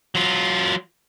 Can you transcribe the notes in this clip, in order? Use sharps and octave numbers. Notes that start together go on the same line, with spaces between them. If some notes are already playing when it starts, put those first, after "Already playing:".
F#3 F4